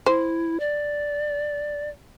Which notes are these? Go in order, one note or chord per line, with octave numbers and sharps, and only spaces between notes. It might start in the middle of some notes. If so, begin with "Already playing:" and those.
E4 C5
D5